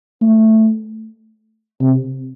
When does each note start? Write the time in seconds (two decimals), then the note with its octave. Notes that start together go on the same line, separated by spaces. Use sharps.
0.21 A3
1.81 C3